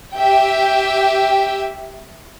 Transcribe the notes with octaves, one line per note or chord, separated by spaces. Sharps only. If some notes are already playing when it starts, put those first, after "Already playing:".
G4 E5 G5